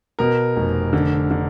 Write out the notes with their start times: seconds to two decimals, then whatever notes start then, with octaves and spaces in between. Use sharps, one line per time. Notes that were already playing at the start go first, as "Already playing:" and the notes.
0.19 B2 A#4
0.56 F1
0.93 D3
1.31 D3